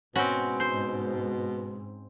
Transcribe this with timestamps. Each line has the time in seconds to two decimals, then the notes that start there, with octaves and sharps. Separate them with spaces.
0.16 G#2 B2 C4 C#4 F#4 B5
0.60 C5